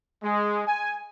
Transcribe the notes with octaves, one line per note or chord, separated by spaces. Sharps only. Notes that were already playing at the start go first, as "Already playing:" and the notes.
G#3
G#5